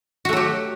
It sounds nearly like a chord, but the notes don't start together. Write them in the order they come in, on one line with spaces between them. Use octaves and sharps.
F#4 A3 F#3 G4